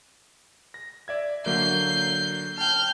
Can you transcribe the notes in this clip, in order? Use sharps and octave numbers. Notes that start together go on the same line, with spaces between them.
A#6
D5 E5 G#6
D3 F#3 A#3 G6 C7
G5 A5 F6 G6